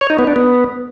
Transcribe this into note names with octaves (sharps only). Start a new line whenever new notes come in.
C#5
D#4
B3
D4
B3